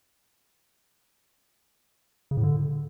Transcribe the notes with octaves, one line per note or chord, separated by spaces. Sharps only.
C#3
A2
D3